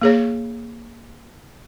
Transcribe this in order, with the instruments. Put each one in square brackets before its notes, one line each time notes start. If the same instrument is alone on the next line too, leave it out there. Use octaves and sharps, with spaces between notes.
[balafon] A#3 G#4 C#5